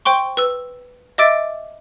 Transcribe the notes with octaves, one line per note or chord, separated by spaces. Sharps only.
C5 G5 C6 C#6
B4 E6
D#5 E5 D6 E6 A6 D7